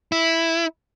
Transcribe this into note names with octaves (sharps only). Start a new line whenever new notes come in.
E4